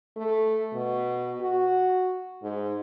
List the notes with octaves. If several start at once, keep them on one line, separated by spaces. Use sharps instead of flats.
A3
B2
F#4
G#2